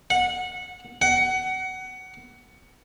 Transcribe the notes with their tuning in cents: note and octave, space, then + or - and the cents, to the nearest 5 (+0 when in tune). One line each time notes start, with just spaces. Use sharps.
F#5 -20
F#5 +20